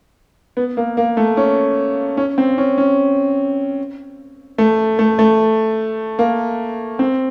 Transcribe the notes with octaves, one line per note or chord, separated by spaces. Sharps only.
B3
A#3
A#3
A3
C#4
C#4
C4
C#4
C#4
A3
A3
A3
A#3
C4